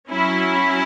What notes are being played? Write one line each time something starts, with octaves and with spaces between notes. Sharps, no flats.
F#3 C#4 E4